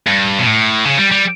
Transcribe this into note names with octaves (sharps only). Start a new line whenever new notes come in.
G2
B2
A2
C#3
G3
G3